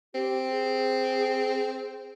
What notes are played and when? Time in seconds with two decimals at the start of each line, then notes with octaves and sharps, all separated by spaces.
0.15 C4 G4
0.50 G#4